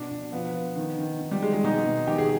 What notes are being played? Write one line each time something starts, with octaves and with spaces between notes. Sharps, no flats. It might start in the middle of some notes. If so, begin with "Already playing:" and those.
Already playing: B2 D4
B2
F3 B3
F3
D#3
D#3
D#3
G3
D#3 G#3
G#3
B2 D#4
B2
D#3 G4
G#4